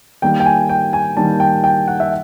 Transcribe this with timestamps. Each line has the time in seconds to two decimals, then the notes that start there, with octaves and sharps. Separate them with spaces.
0.22 D#3 G3 A#3 G5
0.40 G5
0.46 G#5
0.69 G5
0.93 G#5
1.17 D#3 G3 A#3 A5
1.40 G5
1.64 G5
1.88 F#5
2.00 E5